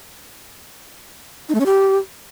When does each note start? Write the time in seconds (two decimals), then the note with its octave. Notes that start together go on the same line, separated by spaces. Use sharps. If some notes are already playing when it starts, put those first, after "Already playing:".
1.49 D#4
1.55 A3
1.60 C#4
1.66 G4